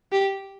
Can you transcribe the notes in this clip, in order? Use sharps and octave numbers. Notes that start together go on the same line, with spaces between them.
G4